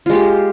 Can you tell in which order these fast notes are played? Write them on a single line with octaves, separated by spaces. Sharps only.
F4 G#3 G4